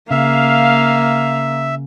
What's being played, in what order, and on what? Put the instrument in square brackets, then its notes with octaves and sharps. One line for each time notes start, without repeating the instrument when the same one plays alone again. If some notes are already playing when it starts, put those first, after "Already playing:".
[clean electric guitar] C#3 [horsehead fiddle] A#3 [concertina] E5 [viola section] F5